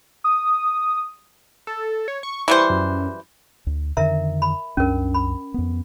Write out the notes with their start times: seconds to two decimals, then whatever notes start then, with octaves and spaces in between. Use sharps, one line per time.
0.24 D#6
1.67 A4
2.08 C#5
2.23 C#6
2.48 E3 G3 C5 C#6
2.70 F#2
3.67 D2
3.97 F2 D3 D#3 A#4 E5 A#5
4.42 B5
4.77 C2 F#2 C#4 D4 A#4
5.14 B5
5.54 F2 B3